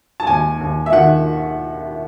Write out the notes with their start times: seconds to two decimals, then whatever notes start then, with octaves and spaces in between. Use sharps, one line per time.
0.20 A5
0.27 D#2 G#5
0.61 D#2
0.86 E5
0.92 D#3 F#5